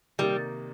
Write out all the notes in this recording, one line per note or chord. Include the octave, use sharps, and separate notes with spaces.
C3 D#3 G3 A#3 D#4